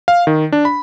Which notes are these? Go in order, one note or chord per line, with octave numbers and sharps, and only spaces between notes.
F5
D#3
D4
B5